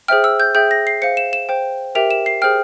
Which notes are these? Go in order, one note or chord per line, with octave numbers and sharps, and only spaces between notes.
G#4 C5 E5 G5 F6
E6
G6
G#4 E5 G5 G6
A#6
C7
C5 F5 C#7
E7
E7
C5 G5
G4 A#4 E5 G5 F7
E7
C7
G#4 C5 G5 F6